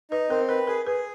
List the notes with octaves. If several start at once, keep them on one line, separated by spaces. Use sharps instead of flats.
D#4 B4
C4 A#4
A#4 B4
G#4 A#4
G#4 B4